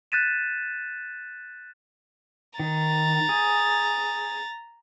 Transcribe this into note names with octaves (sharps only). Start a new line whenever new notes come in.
F#6 G6 A6 B6 D#7 E7
D#3 A#5 A6
G#4